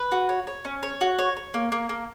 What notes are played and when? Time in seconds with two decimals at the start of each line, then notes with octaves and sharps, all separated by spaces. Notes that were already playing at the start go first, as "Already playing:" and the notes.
Already playing: B4
0.12 F#4
0.29 C#5
0.47 C#5
0.65 C#4
0.83 C#5
1.01 F#4
1.19 C#5
1.37 C#5
1.54 A#3
1.72 A#3
1.89 A#3